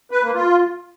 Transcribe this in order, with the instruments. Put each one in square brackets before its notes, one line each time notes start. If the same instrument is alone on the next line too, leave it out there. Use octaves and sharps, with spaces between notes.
[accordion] B4
A#3
F4